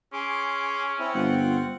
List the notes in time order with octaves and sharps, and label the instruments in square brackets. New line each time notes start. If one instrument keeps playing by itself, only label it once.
[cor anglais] C#4 [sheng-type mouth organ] G#4 C6 D6
[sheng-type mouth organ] C4 E4
[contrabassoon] G1 [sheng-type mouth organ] C4 F4 F#5